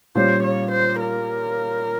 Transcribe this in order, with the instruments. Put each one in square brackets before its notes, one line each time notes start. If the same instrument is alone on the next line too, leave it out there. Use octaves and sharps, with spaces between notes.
[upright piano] A#2 G3 C#4 [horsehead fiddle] C5
[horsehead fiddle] C#5
C5
A#4